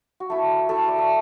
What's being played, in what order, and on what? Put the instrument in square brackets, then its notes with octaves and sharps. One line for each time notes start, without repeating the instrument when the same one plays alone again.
[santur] F#4
A3 E4 A4
A3 E4 A4
D5
E5